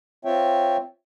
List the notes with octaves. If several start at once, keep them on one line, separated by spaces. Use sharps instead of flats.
C4 F4 C#5 E5 G5